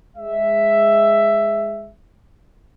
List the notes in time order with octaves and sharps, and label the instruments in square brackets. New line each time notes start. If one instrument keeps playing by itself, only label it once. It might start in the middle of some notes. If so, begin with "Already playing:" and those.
[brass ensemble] G#3 E5